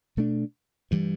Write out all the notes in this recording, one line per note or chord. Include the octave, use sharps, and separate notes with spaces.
B2 A3 D4
G2 E3 G3